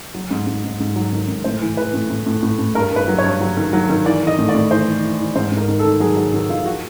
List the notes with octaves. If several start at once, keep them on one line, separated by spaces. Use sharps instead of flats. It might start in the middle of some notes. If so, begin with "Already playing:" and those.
F#3
G#2
G#2
G#2
G#2
F#3
D#3
G#2
A2 C5
E3
E3 B4
A2
A2
A2
A2
A2
G2 A#4
G2 B4
F#3
C#5
G2
F#3
D#3
F#3
D#3
E3 D5
E3
D#5
A2
D5
A2
E3 C5
E3
E3
E3
G#2 C5
G#2
A#4
D#3
A4
D#3
F#3 G#4
F#3
D#3 F#4
D#3 F4
F3 F#4